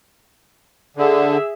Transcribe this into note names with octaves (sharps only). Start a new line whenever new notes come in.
D3 G#4 E5